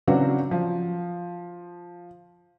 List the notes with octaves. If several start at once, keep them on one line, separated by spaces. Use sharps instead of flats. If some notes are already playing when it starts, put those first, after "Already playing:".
C#3 E3 F#3 C4 D4 F#4
F3